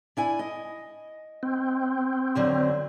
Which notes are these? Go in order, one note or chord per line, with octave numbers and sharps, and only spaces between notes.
D4 E4 G#5
D#5
C4
F2 D3 F#3